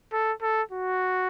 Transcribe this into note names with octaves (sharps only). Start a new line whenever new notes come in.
A4
A4
F#4